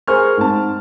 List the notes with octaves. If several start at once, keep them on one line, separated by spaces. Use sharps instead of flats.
G#4 A#4 C5 G#5 C#6 F6
G#2 C4 A5